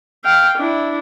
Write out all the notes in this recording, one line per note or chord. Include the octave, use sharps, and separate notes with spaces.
F5 G5
D4 E4